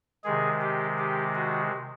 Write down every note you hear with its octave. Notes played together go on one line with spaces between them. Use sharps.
C3 D#3 G#3 G#4
G4
G4
F#4